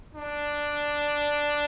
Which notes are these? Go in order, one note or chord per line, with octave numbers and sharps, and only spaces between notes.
D4